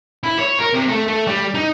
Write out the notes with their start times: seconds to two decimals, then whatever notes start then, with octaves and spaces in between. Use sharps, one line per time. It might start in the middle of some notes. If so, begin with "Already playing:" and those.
0.23 E4
0.39 C#5
0.59 A#4
0.73 C3
0.88 A3
1.08 A3
1.27 G3
1.54 D#4